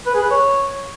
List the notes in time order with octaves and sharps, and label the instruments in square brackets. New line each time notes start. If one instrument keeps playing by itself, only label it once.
[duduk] B4
G#4
B4
C#5